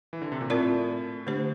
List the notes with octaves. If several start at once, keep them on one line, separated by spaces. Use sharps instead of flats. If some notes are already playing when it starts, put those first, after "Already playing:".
E3
D3
C3
A#2
A2 C4 F4 A#4 D5
D3 A3 D4 G4 C5